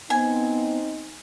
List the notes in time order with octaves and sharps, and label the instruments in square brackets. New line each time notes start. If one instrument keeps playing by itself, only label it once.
[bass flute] B3 [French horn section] C4 D#4 [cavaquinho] G#5